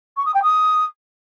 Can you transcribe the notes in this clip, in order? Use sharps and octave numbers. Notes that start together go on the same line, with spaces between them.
C#6
D#6
G5
D#6